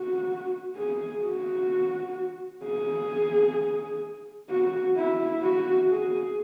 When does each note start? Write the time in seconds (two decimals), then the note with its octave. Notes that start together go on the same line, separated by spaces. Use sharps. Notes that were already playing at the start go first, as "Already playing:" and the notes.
Already playing: F#4
0.77 G#4
1.24 F#4
2.64 G#4
4.50 F#4
4.97 E4
5.43 F#4
5.89 G#4